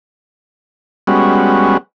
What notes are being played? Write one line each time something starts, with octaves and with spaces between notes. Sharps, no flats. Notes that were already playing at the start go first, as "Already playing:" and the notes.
G3 G#3 B3 C#4 F#4